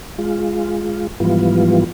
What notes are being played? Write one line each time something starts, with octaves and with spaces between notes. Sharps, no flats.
G#3 F4
G#2 E3 F3 G3 B3 F4